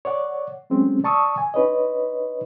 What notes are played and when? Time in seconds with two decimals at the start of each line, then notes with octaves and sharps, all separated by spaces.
0.05 C#5 D5 F#5
0.70 F#3 G#3 A3 C4 C#4
1.04 D5 A5 C#6 D#6 E6
1.38 G#5
1.54 D4 D#4 B4 C#5 D#5